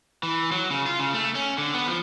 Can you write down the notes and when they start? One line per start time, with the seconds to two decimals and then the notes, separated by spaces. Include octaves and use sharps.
0.23 E3
0.52 F#3
0.70 C#3
0.86 F4
0.99 C#3
1.14 A3
1.35 C#4
1.58 D3
1.74 B3
1.88 F3